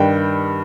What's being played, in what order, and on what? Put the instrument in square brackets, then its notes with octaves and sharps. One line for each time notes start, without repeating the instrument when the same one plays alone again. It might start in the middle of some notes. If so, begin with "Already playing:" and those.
Already playing: [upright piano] G2 D#3 G3 D4 G5